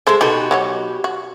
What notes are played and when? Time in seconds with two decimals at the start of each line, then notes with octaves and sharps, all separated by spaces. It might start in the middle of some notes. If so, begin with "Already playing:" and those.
0.07 G#3 A4 C5 E5
0.21 B2 D#4 F#4 G4 A4 B4
0.51 F#3 D#4 C#5
1.04 F#4